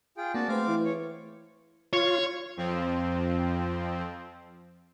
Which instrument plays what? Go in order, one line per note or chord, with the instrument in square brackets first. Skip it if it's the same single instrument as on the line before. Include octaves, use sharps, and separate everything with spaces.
[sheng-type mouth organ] F4 G#4 G5
[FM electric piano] A#3 C4 D4 [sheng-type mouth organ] F#4 D5 A5
[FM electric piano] A3 G#4 B4 [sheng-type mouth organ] C4 F5 D6
[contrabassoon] E3
[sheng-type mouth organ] C#5
[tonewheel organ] F4 [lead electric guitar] C#5
[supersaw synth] F2 F3 C4